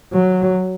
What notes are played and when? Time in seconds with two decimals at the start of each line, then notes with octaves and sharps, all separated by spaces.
0.13 F#3